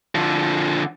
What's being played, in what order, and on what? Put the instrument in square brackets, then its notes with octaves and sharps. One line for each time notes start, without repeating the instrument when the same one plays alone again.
[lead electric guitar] D3 F3